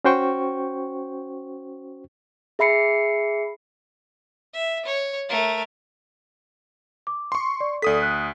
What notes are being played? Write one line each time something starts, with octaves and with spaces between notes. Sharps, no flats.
C#4 F#4 C5 G5 C#6
G#4 E5 B5 C7 C#7
E5
C#5
A3 A#4
D6
C6 C#6
D5
D2 A4 D5 D#6 B6
F#6